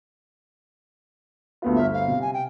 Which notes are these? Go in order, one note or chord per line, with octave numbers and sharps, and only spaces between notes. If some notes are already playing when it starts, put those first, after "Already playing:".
D2 B3 F4
G1 C5 E5 F6
F5
C3
G#5
G5